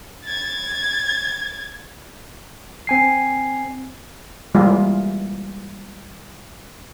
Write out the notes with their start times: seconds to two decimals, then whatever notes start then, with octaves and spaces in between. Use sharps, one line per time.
0.25 G#6 A6
2.87 C4 G#5 C7
4.55 E3 G3 G#3 A#3 F4